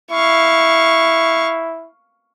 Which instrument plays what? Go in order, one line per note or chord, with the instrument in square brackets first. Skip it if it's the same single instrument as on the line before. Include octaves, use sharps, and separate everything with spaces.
[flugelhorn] E4 [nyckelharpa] F5 C#6